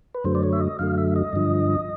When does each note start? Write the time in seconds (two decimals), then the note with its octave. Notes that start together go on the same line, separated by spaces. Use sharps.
0.14 B4
0.24 F#2 D3 F#3 A3 C5
0.35 D5
0.43 C#5
0.53 E5
0.61 D#5
0.79 F#2 D3 F#3 A3 F5
0.98 E5
1.16 D#5
1.33 G2 D3 F3